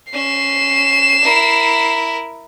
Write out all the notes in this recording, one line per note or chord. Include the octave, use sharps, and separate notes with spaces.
C#4 C7 E7
E4 A#4